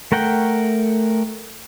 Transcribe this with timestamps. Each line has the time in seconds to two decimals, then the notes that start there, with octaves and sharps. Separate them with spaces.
0.12 A3 A#4 F#5 G5